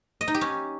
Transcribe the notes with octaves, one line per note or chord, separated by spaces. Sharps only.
D#5
D#4
G4
C#4